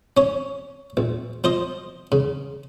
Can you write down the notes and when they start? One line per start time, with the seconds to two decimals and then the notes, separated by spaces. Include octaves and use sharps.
0.17 C#4 C#5
0.97 A#1
1.44 F3 C5 D#5
2.12 C#3